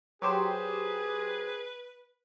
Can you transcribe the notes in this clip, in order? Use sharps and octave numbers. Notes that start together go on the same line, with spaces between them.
F#3 G4 G#4 B4 C5